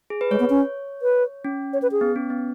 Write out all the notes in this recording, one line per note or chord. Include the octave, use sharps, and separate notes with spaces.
G#4
B4
G#3 C#5
B3
C#4
B4
C#4
C#5
B4
G#4
B3
C#4
B3